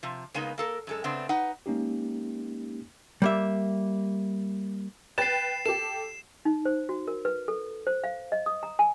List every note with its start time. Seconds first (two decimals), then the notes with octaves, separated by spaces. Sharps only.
0.03 C3 F3
0.34 C#3 G#3 A#3 B3 D#4
0.58 A#3 A4 A#4
0.87 F#2 G#3 A4
1.04 C#3 A3 B3 C4 D4
1.29 D#4 B4 F#5
1.66 G#3 A#3 C#4 D#4 G4
3.22 G3 A#3 E5
5.18 B4 G5 A6 C7 E7
5.66 G4 A4 E7
6.45 D#4
6.65 C5
6.89 F#4
7.08 A#4
7.25 B4
7.48 A4
7.87 C5
8.04 F5
8.32 D#5
8.46 D#6
8.63 A#5
8.79 G#5